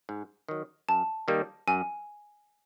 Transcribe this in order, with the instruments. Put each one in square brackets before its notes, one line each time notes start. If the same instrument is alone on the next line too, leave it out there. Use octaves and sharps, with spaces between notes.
[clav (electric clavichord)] G#2
D#3 F#3
[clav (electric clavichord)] F#2 [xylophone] A5
[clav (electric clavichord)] D#3 G3 A#3
[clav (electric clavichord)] F#2 [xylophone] G#5